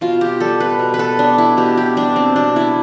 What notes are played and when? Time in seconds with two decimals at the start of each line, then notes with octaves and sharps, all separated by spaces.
0.01 B2 F4
0.21 G4
0.40 G3 A4
0.60 B4
0.79 B2
0.94 B4
0.99 A4
1.19 B3 D4
1.38 E4
1.57 B2 G4
1.77 G4
1.97 G3 D4
2.16 C4
2.36 B2 D4
2.56 E4